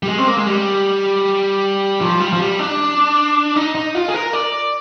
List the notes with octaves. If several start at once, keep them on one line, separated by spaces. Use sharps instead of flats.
G3
G#3
C4
A#3
G#3
G3
F3
G3
F3
G3
D4
D#4
D#4
F4
G#4
A#4
D5